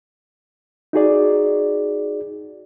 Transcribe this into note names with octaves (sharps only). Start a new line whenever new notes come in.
D#4 F#4 G#4 D5